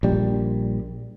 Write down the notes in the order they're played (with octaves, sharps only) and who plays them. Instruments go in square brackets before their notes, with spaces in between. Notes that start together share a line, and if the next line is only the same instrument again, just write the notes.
[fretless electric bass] A#1 G3